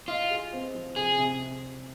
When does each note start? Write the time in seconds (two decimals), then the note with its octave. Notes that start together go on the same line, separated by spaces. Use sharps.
0.08 F4 D#5
0.30 G#4
0.53 C4
0.75 F3
0.96 C3 G#4
1.18 C3